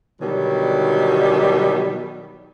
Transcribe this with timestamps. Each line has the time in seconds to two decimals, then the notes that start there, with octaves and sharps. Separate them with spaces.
0.21 B2 D3 D#3 F#3 G3